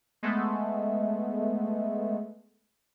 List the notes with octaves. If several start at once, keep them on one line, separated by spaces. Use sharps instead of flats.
G#3 A3 B3